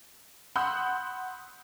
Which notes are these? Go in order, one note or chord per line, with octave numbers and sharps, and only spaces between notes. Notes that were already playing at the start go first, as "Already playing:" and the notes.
F#5 B5 C6 D#6 E6 G6